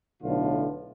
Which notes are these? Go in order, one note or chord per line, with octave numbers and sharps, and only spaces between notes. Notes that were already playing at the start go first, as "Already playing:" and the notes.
B1 A2 D3 F4